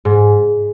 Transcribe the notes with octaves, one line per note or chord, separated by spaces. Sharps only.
G#2